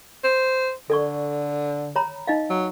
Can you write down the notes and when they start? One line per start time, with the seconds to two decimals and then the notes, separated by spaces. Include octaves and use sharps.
0.24 C5
0.90 D3 A4 D5 C#6
1.96 C#5 A#5 B5
2.27 D#4 D#5 F5
2.50 F#3